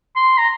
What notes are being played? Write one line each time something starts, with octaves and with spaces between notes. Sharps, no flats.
C6
A#5